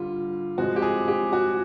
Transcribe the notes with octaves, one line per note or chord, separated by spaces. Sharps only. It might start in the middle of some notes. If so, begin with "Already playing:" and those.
Already playing: D3 G3 F4
C3 F3 G#3 F#4
G4
G#4
G4
F#4